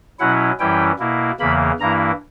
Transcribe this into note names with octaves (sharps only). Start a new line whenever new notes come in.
B2 F#3 C#4 E4 F#5
F#2 E3 G3 C#4 E4 G5
B2 A#3 E4
E2 C#3 E3 A#3 B5
G2 E3 A#3 E4 A#5